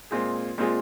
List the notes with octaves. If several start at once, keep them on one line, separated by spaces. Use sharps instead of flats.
A#2 G#3 C4 F4 G#4
A#2 G#3 C4 F4 G#4